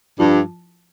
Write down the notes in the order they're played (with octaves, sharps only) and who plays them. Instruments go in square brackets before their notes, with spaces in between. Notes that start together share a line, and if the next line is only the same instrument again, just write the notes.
[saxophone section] G2 [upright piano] F3